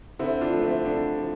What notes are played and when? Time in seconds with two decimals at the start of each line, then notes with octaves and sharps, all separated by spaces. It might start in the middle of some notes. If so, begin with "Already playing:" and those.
0.19 D3 C4 E4
0.41 D4 F4
0.52 F3 A3
0.63 C4 E4
0.85 D3 D4
1.18 F3